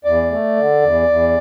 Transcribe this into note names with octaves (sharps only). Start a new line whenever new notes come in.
E2 D5
A3
D3
E2
E2